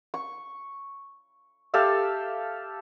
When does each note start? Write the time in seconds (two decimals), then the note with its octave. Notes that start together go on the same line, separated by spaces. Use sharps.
0.14 C#6
1.74 G4 A4 E5 F5